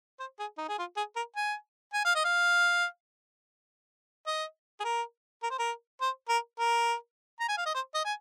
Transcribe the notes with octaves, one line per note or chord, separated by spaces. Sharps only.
C5
G#4
D#4
G#4
F4
G#4
A#4
G#5
G#5
F5
D#5
F5
D#5
G#4
A#4
A#4
C5
A#4
C5
A#4
A#4
A#5
G#5
F5
D#5
C5
D#5
G#5